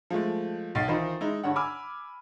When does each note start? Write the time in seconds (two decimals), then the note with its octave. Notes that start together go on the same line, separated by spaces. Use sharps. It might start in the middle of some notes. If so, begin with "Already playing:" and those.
0.10 F3 G#3 A3
0.75 B1 A6 C7
0.88 D#3 E3 D#4 F4 C5
1.21 G#3 D#4 E4
1.44 G2 D3 C#5 F#5
1.56 G#5 B5 D6 E6 F6